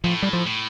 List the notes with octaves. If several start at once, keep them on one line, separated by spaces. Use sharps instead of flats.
A2 F3
G3
F3
A2